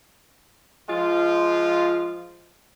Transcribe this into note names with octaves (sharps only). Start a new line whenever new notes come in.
F3 G#3 F4